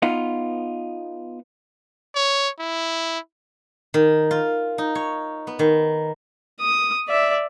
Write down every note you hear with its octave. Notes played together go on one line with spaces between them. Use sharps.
B3 D#4 F4
C#5
E4
D#3
F4
D#4
C#5
B3
D#3
D#6
D5 E5